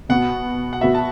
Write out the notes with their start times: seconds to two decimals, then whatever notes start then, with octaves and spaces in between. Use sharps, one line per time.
0.09 B2 B3 F#4 F#5
0.73 F#5
0.81 B2 B3 F#4 E5
0.95 A5